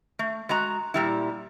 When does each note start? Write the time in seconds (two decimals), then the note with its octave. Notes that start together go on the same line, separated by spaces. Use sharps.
0.19 A3
0.49 G#3 F#4 A#5
0.94 A#2 G3 E4